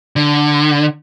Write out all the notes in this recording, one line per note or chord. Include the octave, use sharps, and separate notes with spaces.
D3